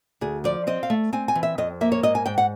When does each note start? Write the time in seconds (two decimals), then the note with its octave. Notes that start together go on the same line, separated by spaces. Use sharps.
0.21 D2 G#4
0.44 F3 D5
0.67 C4 D#5
0.83 F5
0.90 A3
1.13 C4 G#5
1.28 G#5
1.35 E3
1.43 E5
1.58 F2 D#5
1.81 A#3 E5
1.92 C#5
2.03 G#2 D#5
2.15 G#5
2.26 G#2 G5
2.38 F#5